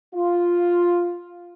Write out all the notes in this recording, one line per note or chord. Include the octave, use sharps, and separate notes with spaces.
F4